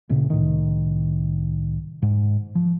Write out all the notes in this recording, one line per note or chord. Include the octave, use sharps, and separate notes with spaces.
D1 A#2 C#3
C2 A2 D#3
G#2
F3